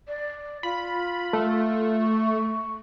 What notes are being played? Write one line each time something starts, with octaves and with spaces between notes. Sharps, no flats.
D5
F4 B5
A3
C#6